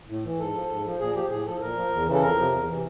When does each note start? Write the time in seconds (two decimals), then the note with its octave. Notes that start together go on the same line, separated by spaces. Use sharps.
0.09 A2
0.24 E3
0.39 G#2 A4
0.54 F3
0.70 G#2
0.85 F3
1.00 A#2 G#4
1.15 F3 G4
1.30 A2 G#4
1.46 F3 A4
1.61 A#2 A#4
1.76 F3
1.91 E2
2.07 C#3 E3
2.14 A4
2.22 F2 A#4
2.37 C3 F3
2.52 E2
2.68 C3 E3